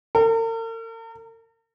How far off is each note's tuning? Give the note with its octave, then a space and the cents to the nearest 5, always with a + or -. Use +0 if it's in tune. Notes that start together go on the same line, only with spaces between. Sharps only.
A#4 -45